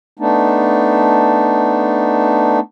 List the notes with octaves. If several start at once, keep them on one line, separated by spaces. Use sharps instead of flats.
A3 B3 D4 D#4